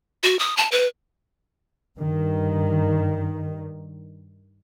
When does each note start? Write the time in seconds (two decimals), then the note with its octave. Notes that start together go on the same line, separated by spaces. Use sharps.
0.23 F#4
0.39 D#6
0.57 A5
0.72 B4
1.97 G2 D#3